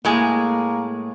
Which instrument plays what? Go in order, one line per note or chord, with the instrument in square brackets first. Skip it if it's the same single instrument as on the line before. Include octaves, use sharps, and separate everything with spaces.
[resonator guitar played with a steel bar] A2 G#3 G#4 [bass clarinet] A#3